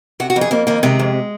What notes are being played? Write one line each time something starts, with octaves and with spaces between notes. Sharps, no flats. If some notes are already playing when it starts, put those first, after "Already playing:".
C3 F#4
F#4
F2
G#4
F2 A#3
D#3 A#3
C3 G#3
F2